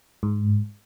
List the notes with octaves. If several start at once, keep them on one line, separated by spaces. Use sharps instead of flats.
G#2